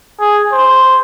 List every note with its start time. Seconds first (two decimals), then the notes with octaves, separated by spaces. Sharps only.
0.20 G#4
0.52 C5